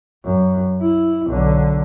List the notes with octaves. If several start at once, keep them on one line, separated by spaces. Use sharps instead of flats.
F#2
E4
B1 D3